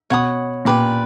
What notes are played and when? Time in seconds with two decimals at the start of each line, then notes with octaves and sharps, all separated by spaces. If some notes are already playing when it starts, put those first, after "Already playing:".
0.10 B2 C#5 F#5 B5 D#6
0.65 A#2 G4 B4 D5